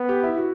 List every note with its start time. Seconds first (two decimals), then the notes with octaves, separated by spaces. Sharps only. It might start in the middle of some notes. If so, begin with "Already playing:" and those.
Already playing: B3
0.09 G4
0.23 E4
0.38 F#4